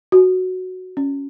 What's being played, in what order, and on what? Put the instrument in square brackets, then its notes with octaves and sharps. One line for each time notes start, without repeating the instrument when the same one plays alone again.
[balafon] F#4
C#4